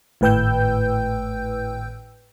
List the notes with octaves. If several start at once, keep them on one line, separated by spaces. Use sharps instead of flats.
G#1 A2 B4 G5 E6 G6